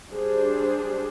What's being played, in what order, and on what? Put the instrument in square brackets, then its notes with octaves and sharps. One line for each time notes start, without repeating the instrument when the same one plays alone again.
[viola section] G3 D4 G#4 C5